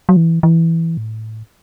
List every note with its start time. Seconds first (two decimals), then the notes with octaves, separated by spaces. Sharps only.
0.09 F#3
0.17 E3
0.43 E3
0.97 A2